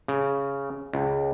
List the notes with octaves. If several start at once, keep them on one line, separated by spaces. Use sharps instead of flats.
C#3
C#2